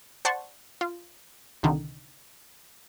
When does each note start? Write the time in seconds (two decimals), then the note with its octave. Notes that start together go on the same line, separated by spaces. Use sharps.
0.25 C5 D5 F#5 A5 C6 C#6
0.81 F4
1.63 C2 D3 D#3